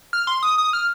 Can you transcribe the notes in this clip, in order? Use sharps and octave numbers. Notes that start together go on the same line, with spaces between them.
F6
C6
D#6
D#6
F6